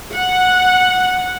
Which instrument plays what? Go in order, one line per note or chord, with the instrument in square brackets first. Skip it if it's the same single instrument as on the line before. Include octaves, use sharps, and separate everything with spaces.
[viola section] F#5